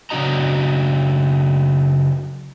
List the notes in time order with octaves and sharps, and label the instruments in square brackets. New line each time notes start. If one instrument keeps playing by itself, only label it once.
[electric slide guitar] C#3 F#3 D4 F#4 D#5 A#5